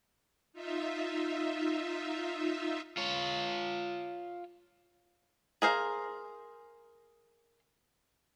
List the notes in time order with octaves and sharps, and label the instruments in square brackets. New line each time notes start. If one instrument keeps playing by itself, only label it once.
[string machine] D#4 F4 E5
[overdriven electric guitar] F4 C#5
[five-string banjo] G#4 A#4 C5 F5